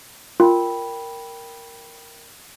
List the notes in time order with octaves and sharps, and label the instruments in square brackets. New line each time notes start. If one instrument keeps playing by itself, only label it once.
[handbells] F4 [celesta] A#4 G5 B5